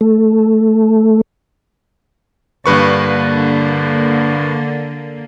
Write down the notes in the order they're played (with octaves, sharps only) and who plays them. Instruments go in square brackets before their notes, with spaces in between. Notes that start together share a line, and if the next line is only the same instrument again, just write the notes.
[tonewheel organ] A3
[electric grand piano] G2 B4 C#6 [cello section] D3 A#3